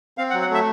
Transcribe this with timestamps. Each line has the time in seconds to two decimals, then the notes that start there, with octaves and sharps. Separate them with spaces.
0.18 C4 F5
0.30 F#5
0.34 F#3
0.41 F#5
0.50 A3 E5